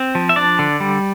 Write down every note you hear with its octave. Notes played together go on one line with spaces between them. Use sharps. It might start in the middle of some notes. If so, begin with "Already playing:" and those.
Already playing: C4
F3
E5
D4 D5
D3
G3